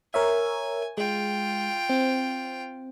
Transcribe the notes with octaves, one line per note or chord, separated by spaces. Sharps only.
A#4 C#5 E5 G#5
G#3 F4 G5
C4